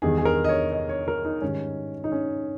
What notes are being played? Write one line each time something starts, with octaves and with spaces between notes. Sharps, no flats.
E2 D#3 G3 G#4
G#4
A#4
D#5
C#5
D#5
C#5
A#4
D#4
G#2 D#3 G3 C#4
D#4
C#4